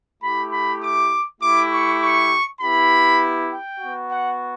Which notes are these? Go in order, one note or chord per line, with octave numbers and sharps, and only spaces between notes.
A3 E4 G4 B5
B5
D6
A3 E4 G4 D6
C#6
C#6
B3 E4 G4 B5
G5
B3 F#4
F#5